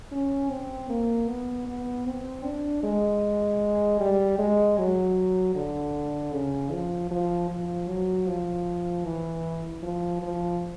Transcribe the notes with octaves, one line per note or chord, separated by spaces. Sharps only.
C#4
C4
A#3
B3
B3
C4
D4
G#3
G3
G#3
F#3
D3
C#3
F3
F3
F3
F#3
F3
E3
F3
F3